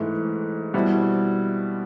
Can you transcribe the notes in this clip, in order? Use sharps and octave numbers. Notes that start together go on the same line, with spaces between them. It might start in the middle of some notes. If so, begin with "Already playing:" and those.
Already playing: G#2 E3 A3
B2 G3 C4 E4